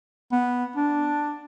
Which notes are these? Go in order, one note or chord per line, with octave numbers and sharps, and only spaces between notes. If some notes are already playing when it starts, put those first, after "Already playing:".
B3
D4